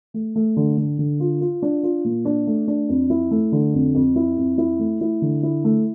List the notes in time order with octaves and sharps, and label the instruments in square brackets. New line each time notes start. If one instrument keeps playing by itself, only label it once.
[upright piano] A3
A3
D3
D3
D3
F4
F4
D4
F4
A#2
D4
A3
D4
F2
E4
A3
D3
F2
F2
E4
F2
E4
A3
E4
D3
E4
A3